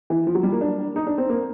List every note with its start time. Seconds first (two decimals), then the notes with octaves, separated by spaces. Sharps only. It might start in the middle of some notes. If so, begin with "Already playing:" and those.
0.10 E3
0.27 F3
0.35 F#3
0.43 G3
0.52 A#3
0.61 D4
0.96 D#4
1.07 D4
1.18 C4
1.29 A#3